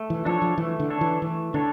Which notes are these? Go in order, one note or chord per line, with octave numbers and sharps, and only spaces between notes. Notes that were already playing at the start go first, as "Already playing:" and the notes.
Already playing: A3
E3
F3 D4 A4 C#5
F3
E3 A3
D3
D4 A4 C#5
E3
E3 A3
D3 D4 A4 C#5